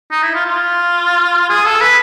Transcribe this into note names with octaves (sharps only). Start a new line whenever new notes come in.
D#4
E4
F4
F4
G#4
A4
B4